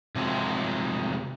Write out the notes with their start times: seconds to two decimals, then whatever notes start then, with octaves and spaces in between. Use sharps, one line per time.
0.15 C3 F3 F#3 G#3